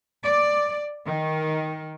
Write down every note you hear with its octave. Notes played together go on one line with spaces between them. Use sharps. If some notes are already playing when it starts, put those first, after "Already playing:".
D5
D#3